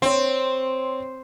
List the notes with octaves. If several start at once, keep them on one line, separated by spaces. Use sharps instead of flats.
C4 C#5 C6